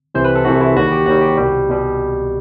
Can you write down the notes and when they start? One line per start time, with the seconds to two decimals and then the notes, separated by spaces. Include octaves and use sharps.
0.15 C2 C3 E3 C5
0.24 B4
0.36 A4
0.45 C2 C3 E3 F#4
0.61 E4
0.76 D#2 D#3 G3 F#4
0.92 G4
1.06 D#2 D#3 G3 F#4
1.21 G4
1.37 C2 B2 G3
1.69 B2 G3